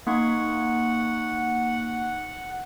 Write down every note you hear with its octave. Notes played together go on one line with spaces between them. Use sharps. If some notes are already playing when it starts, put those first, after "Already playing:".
A#3 D#4 F#5 C#6